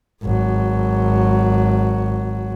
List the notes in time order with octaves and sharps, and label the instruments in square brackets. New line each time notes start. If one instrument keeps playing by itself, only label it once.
[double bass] G#1 F#3